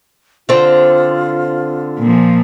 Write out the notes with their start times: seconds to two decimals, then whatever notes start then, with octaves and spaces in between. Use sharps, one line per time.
0.49 D3 C4 F4
1.99 A#2 F3